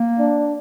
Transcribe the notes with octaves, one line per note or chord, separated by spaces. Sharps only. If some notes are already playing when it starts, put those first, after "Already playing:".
Already playing: A#3
D4